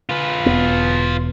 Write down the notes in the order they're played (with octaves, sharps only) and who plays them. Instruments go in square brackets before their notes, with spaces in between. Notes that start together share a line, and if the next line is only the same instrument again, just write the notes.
[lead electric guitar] F4 B4
[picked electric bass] E1 B3